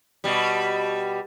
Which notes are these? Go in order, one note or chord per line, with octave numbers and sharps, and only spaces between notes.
B2 G3